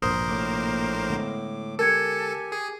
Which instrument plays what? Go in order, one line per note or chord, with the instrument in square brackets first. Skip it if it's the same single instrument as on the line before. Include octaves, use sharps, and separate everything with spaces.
[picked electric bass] E1 G#2 B2 [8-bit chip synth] A#1 A#4 C5 [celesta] D#6
[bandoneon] A2 D6 [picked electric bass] C3 A#3
[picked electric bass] D3 G#3 B3
[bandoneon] G4 G#5 [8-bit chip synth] A4 [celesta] A#4 G#6 C#7
[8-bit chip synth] G#4